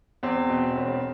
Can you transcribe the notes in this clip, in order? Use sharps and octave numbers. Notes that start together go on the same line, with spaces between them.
E2 C4
B2
E1